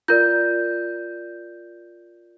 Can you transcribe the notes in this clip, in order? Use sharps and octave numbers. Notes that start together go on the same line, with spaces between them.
F4 A#4 D5 G6